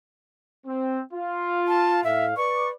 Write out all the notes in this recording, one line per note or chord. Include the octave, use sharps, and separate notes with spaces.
C4
F4
A5
A2 E5 F5
B4 D5 C#6